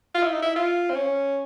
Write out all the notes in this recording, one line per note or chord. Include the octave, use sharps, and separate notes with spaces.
F4
E4
D#4
E4
F4
C4
C#4